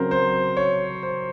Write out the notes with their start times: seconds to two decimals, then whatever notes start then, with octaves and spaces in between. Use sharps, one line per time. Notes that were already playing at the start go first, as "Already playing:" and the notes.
Already playing: C#3 F#3 C4 A#4 C5
0.11 C5
0.57 C#5
1.03 C5